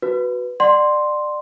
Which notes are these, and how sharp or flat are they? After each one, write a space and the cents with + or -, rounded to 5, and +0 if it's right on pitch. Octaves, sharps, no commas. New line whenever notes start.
F#4 +0 B4 +0
D5 +25 F#5 +15 C6 +0